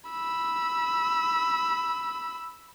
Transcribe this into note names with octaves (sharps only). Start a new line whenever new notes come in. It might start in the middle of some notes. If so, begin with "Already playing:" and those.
B5 E6